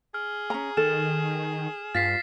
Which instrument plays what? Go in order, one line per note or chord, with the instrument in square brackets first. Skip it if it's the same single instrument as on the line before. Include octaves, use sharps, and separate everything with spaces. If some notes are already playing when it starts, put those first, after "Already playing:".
[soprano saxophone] G#4 [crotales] F6
[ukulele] C#4 A#5
[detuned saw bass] D#3 [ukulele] A4 [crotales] F6 E7
[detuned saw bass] G2 [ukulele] F4 [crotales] A6 B6 C7